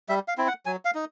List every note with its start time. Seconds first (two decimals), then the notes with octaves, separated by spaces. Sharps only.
0.09 G3 E5
0.28 F5
0.38 C4 E4
0.48 F#5
0.66 F#3 G#5
0.85 F5
0.95 D#4